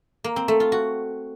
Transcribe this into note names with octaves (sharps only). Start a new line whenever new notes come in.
A#3
C4
A3
F4
F#4